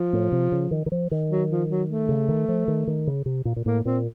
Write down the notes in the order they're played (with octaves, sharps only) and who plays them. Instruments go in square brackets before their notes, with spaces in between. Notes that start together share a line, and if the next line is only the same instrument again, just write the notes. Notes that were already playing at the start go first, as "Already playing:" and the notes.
Already playing: [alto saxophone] F3
[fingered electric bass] A2
C3
C#3
D#3
D#3
F3
D#3
[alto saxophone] F#3
F3
F#3
A3
[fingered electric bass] C#3
D#3
F3
D#3
D#3
C#3
C3
A#2
A#2
[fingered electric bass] A2 [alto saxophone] A#3
[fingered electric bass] A#2 [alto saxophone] C4